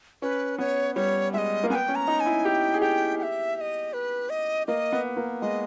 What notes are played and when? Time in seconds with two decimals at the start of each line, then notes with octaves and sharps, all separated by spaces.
0.22 C#4 B4
0.58 B3 C#5
0.96 G3 C#5
1.33 G#3 D#5 E5
1.63 A#3
1.70 B3 G#5
1.75 G5
1.88 C#4
1.95 A#5
2.08 D#4
2.20 G#5
2.26 E4
2.45 G4 G5
2.74 G#4
2.82 G4 G5
3.19 G5
3.23 E5
3.56 E5
3.61 D#5
3.93 B4
4.30 D#5
4.67 A#3 D#5
4.92 B3
5.17 A#3
5.42 G#3 D#5